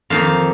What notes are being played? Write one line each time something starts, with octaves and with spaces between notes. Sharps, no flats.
F2 D#3 A#3 D#4 F5